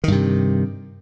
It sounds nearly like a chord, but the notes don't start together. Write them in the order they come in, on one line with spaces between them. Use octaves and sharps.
D#3 G2 C3